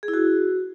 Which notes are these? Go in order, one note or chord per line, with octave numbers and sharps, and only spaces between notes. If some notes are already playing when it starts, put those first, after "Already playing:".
G#4
E4
F#4